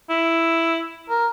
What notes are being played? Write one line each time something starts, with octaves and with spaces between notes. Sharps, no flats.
E4
A#4